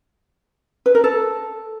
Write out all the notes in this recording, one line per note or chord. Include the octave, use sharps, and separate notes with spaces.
B4
A#4
A4